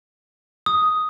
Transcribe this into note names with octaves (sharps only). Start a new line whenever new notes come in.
D#6